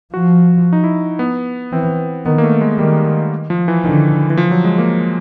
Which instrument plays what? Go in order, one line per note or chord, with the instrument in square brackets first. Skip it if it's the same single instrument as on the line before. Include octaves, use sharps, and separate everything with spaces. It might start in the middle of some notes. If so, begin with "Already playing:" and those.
[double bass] F3 [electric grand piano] F#4
[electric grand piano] D#4
E4
B3
[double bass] E3 [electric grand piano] C4
[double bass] D#3 [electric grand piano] B3
[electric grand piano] A#3
A3
G#3
[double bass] D#3 [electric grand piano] G3
[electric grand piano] F3
E3
[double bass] D3 [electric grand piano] D#3
[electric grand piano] E3
F3
F#3
G#3
A#3